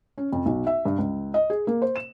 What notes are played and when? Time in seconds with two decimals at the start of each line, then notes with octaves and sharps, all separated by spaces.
0.18 C#4
0.33 F2
0.46 B1
0.67 E5
0.85 G2
0.98 C#2
1.34 D#5
1.50 G#4
1.67 A#3
1.82 C5
1.96 E7